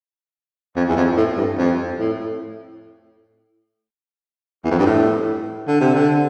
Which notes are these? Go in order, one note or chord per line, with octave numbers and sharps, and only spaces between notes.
F2
E2
F2
A2
G2
F2
A2
E2
F2
G2
A2
D3
C3
D3